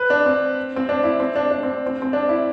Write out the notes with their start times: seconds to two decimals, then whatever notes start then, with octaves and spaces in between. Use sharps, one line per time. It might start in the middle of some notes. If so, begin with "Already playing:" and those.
Already playing: B4
0.10 D4
0.26 C4
0.76 C4
0.89 D4
1.03 E4
1.20 C4
1.35 D4
1.51 D4
1.63 C4
1.86 C4
2.02 C4
2.13 D4
2.29 E4